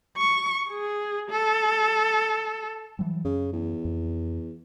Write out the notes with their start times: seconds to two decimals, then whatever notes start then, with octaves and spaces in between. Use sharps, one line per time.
0.17 C#6
0.69 G#4
1.30 A4
2.99 E3 F#3 G3
3.24 F#2 C#3
3.53 E2
3.85 F2